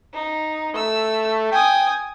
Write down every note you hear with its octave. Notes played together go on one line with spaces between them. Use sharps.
D#4
A3 E6
G5 G#5 D#6